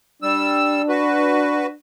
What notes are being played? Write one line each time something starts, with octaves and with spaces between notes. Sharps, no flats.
G3 D4 E6
F#4 B4